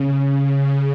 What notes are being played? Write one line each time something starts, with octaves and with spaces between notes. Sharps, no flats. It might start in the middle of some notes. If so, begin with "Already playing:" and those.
Already playing: C#3
C#3
C#3